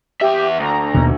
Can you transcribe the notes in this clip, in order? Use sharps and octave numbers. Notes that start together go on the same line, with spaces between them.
E2 G4 E5
D2 A#5
D#2 B2